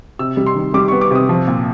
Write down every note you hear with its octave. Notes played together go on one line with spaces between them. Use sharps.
C3 E6
G3
C6
D#3
G3 D6
C#6
B3
D6
C3 D#6
F3
A#2